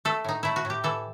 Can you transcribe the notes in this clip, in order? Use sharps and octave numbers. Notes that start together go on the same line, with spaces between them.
A3 A4
A2 D#4
A3 E4
F#4
A2
G4
E3 A4